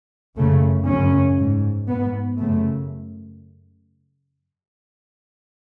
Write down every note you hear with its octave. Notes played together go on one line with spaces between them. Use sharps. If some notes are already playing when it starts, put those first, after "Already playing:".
F#2 C#3 A3
F#2 C#3 C#4
G#2
G#2 B3
F#2 C#3 A3